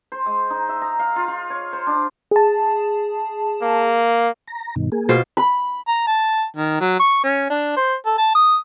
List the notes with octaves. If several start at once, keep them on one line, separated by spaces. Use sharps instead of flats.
C5
G#3
D#4
E5
A#5
F5
F4
F4
C#5
C5
D4
G#4 A5
A#3
A#5
G2 B2 D#3
A#3 G#4
B2 F4 C5
B5
A#5
A5
D#3
F#3
C#6
C#4
D4
C5
A4
A5
D#6